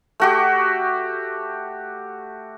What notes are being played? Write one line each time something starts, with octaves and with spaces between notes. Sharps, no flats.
A3 F#4 G4